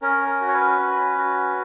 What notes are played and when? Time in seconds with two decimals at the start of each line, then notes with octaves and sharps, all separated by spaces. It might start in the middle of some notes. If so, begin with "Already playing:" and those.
0.02 C#4 A#4
0.27 A#4
0.40 F#4
0.48 C#5
0.53 B4
0.79 C#4
1.18 F#4